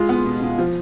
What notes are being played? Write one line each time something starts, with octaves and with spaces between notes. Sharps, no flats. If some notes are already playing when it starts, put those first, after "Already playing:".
Already playing: G#3 F4
B3
B2
B2
F3